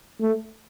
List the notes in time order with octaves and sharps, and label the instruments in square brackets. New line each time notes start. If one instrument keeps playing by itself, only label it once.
[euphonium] A3